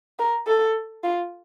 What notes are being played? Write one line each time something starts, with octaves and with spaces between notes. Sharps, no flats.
A#4
A4
F4